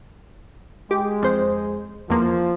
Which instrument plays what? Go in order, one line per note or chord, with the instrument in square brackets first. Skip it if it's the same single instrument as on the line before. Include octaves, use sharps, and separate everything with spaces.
[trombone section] G#3 [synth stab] G4
[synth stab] F2 C5
[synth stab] E2 A#3 [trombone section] F3